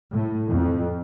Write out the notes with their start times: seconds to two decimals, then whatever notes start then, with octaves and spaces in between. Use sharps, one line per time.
0.13 A2
0.49 F2